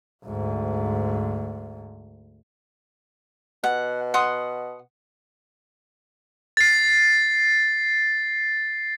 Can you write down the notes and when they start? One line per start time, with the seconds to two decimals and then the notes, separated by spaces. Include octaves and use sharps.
0.25 D2 G#2
3.64 B2 F#5
4.14 F#5 C6 D#6
6.57 A6 C7